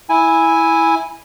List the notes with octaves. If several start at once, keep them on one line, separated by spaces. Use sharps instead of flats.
E4 G#5